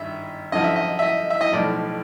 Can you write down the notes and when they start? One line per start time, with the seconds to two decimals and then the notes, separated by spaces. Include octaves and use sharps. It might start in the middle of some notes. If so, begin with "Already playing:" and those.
Already playing: G#1 G2 E5
0.52 F#2 D3 F3 D#5
0.64 E5
0.76 D#5
0.99 E5
1.02 D#5
1.30 E5
1.41 D#5
1.53 B1 A2 F3 D5